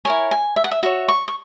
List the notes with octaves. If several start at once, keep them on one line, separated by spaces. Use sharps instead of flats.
E4 A#4 C#5 G#5
G#5
E5
F#5
E5
F#4 C#5 E5
C#6
C#6